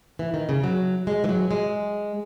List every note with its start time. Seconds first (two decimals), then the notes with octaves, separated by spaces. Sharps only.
0.19 E3
0.34 D#3
0.49 C#3
0.64 F#3
1.07 G#3
1.24 E3
1.29 F#3
1.51 G#3